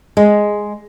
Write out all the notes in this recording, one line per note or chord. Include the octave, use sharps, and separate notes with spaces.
G#3